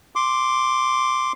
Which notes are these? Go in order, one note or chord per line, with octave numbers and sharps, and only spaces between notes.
C6 D6